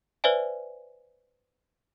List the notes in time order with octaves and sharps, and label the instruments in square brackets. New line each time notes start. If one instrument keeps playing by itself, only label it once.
[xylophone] B4 C5 D5 E5 G#5